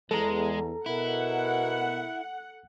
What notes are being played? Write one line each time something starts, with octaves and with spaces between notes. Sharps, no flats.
E2 G#3 A4 A#5
B2 E4 A#4 F#5